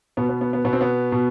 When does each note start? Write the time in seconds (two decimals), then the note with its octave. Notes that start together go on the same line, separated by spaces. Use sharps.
0.17 B2 B3
0.29 B3
0.41 B3
0.53 B3
0.65 B2 B3
0.73 C4
0.81 B3
1.12 B2